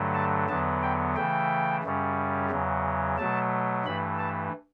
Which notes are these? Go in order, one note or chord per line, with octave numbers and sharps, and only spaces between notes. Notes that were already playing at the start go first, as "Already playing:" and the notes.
Already playing: G2 D3 F#3 A3
A5
E2 D3 F#3 B3 A5
G5
C#3 E3 A3 G5
F#2 C#3 G3 C#4
E2 C#3 F#3
B2 F#3 A3 A5
G2 E3 A3 B5
A5